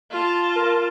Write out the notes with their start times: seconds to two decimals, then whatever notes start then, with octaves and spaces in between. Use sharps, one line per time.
0.11 F4 A5
0.56 A#4